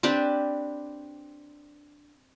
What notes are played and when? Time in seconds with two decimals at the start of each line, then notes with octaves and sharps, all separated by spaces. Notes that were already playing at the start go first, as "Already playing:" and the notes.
0.03 C4 D4 G4 B4